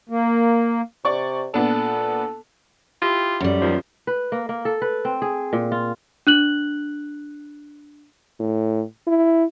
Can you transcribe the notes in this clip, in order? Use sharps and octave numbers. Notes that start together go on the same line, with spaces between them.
A#3
C3 D5 C#6
A#2 B3 D4 A4
E4 F4 G4
F#2 G3
D#2 F3
B4
A#3
A#3
A4
B4
C4
G#4
A#2
F4
D4 F#6 F#7
A2
E4